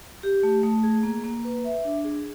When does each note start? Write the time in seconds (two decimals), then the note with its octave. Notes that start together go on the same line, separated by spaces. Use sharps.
0.23 G4
0.43 A3
0.63 A3
0.83 G#4
1.03 A#3
1.24 A#3
1.45 B4
1.64 E5
1.84 D4
2.04 G#4